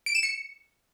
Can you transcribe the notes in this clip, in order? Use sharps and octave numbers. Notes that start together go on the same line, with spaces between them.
D7
E7
C#7